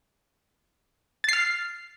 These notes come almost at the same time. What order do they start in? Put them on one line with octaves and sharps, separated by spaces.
A6 C7 F6